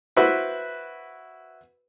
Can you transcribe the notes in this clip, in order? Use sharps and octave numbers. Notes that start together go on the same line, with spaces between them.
E4 F#4 B4 C5 E5